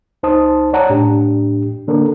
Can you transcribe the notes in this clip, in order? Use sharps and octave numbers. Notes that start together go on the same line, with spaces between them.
C#2 D#4 C5 A5 D#6
C#5 D5 F#5 A5 A#5
A2 D4 G4
D3 A#3 D4 A4 A#4